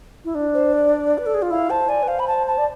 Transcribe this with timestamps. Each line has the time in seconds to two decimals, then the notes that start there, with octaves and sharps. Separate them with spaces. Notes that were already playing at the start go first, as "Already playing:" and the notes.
0.25 E4
0.35 D4
0.54 C5
0.73 D5
1.18 B4
1.26 A4
1.34 G#4
1.42 F4
1.51 E4 F5
1.70 C5 A5
1.89 D5 G#5
2.03 B4
2.08 C5 F5
2.19 B5
2.27 A5
2.47 A5
2.58 D5